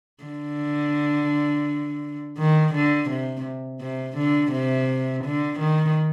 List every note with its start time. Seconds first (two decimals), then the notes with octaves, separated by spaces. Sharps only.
0.23 D3
2.38 D#3
2.74 D3
3.10 C3
3.80 C3
4.17 D3
4.52 C3
5.24 D3
5.60 D#3